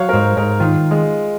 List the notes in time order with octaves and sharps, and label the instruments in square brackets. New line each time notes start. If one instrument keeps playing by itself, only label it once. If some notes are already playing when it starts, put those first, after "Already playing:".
Already playing: [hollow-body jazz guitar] F#3 [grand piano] C#5 F5
[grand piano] A#4
[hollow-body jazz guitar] G#2 [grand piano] C5
[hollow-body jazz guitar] G#2 [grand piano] A#4
[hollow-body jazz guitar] D#3 [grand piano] F4
[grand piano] G#3